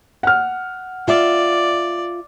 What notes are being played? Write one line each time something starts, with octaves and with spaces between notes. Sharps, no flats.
F#5 F6
F4 D5 E5